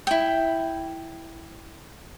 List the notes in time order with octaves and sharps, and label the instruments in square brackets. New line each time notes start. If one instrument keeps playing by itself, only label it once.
[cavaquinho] E4 G5